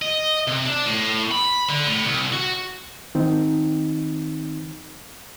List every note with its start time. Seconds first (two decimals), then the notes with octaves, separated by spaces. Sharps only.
0.02 D#5
0.48 C3
0.66 D4
0.87 A2
1.31 B5
1.69 D3
1.87 A2
2.05 C2
2.32 F#4
3.15 D#3 C4 D#4